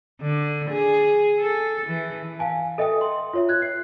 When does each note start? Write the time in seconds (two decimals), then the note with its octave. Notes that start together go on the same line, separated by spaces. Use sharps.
0.21 D3
0.70 G#4
1.40 A4
1.86 E3
2.39 F5 G#5 A5
2.78 A4 D#5 E5 G5 D#6
3.01 C6
3.33 F4 C#5 E5
3.49 F#6 G#6
3.62 C7